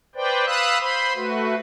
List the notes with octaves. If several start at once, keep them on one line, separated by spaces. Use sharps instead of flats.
B4 C5 D5 G5
F5 B5 D#6 E6 F#6
C5 B5 C6
A3 F#4 B4